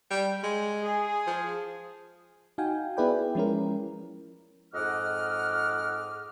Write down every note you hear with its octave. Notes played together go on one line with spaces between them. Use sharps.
G3
G#3
G#4
F3
D#4 F#4 F5 G5 G#5
B3 E4 G#4 B4 D5 G5
F3 G#3 C#4 E4 A#4
F2 G#2 D#5 F#5 D6 F6